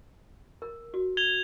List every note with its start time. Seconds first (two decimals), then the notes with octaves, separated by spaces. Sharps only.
0.62 A#4
0.94 F#4
1.17 G#6 F7 G7